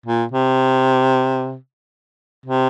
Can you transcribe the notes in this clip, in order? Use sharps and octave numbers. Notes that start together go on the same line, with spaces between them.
A#2
C3
C3